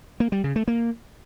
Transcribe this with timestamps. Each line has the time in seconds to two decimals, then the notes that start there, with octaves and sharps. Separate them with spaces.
0.20 A#3
0.32 G3
0.44 C#3
0.56 A3
0.68 A#3